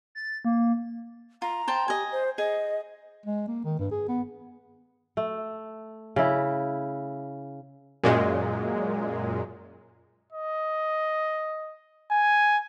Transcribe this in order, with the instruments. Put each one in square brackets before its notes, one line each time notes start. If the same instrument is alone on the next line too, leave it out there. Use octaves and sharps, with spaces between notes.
[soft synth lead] A6
A#3
[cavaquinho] F4 [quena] A#5
[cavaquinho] C5 G5 A5
[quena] G4 [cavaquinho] D#5 G#5
[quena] C5
[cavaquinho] G#4 [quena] D#5
[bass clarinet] G#3
A#3
D#3
G2
G#4
B3
[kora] A3
C#3 E4
[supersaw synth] F#2 A#2 G#3
[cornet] D#5
G#5